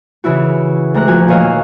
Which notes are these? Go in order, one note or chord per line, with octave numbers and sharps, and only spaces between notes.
C#3 E3 E4 F#4
D2 G#3 A#5 F#6
A#2 F3 F#4 G#5
D#2 A#2 F#4 C#5 D#5 F5